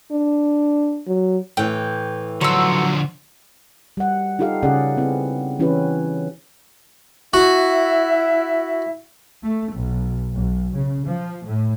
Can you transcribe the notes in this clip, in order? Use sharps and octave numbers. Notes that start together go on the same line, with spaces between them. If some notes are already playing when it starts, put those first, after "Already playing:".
D4
F#3
A2 E3 G5
D3 F3 F#3 C#5 C6 E6
G3 F#5
D#4 F4 G4 A4 F5
C#3 C#4 G#4 D5 F#5
B3 C4 E4
E3 C#4 E4 G4 B4
E4 F#4 E5
A3
B1
B1
C#3
F3
A2